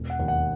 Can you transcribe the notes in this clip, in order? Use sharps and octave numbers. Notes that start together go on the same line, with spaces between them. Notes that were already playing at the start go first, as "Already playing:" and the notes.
Already playing: E1
F#5
D#2
F#5